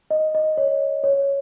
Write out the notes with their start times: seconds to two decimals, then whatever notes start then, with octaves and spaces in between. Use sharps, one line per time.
0.11 D#5
0.35 D#5
0.57 C#5
1.04 C#5